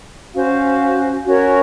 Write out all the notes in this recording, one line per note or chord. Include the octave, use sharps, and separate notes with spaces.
C#4 F#4 C5 F5
C#4 F#4 A#4 C#5